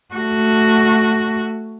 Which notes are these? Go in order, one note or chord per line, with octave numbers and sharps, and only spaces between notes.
A3 F#4